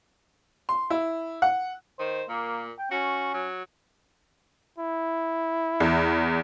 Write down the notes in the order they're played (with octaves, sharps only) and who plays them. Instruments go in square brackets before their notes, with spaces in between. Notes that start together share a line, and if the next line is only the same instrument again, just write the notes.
[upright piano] C6
E4
F#5
[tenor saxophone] D#3 [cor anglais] C5
[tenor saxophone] A#2 [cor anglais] A#3
[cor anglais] G5
[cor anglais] C#4 [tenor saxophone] F#4
[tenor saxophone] F#3
[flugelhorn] E4
[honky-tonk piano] E2